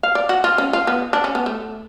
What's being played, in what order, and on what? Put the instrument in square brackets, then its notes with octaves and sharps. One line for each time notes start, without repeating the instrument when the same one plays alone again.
[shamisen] F5
D5
F#4
F4
C#4
F4
B3
D4
C#4
B3
A3